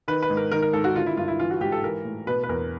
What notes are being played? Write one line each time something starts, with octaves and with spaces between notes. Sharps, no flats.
D#3 B4
B4
G#2
A#4
D#3 A#4
A#4
G#2 A4
F#4
D3 F4
E4
G2 F4
E4
E3 F4
F#4
G#2 G4
A4
E3 A#4
A2
B2 B4
B4
E2 A#4